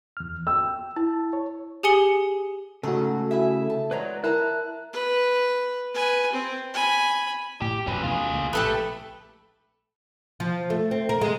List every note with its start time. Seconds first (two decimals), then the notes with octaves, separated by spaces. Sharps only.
0.17 E2 F6
0.47 G5 E6
0.96 E4 A5
1.33 C#5
1.83 G4 G#4 G#5 D#6 C#7 G7
2.83 G#2 C#3 F#3 A3 F#4 A4
3.31 E4 G#4 E5
3.70 A5
3.91 F#3 G#3 B4 C#5 D5 A#5
4.24 E4 A#4 B4 A5 A#5 F#6
4.93 B4
5.94 B4 G#5
6.32 C4
6.74 G#5 B5
7.61 A2 G4
7.87 F2 C3 F#3 C#4 B4
8.03 D#2 B2 A3 F4 G#4
8.33 C#2 A#3
8.53 A#1 A2 C3 A3 G4 A4 B4
10.40 F3
10.70 A3
10.91 C4
11.09 A#4
11.21 G#3